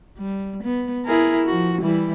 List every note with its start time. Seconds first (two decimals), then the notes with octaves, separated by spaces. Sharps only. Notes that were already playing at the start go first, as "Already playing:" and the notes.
0.18 G3
0.63 B3
1.06 E4 G#4 A#4
1.46 F3 F#4
1.81 E3 G3 E4